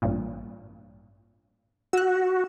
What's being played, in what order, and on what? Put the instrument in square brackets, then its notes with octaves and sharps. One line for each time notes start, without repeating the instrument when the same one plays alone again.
[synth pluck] A1 G2 A#2
[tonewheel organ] F#4 [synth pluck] E6 F#6